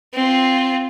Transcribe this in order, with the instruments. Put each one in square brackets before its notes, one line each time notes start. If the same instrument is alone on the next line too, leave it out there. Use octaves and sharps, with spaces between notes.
[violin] C4 F4